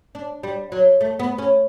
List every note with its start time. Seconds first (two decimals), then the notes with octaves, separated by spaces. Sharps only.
0.15 D4
0.43 G3
0.72 F#3
1.01 A3
1.20 B3
1.38 C#4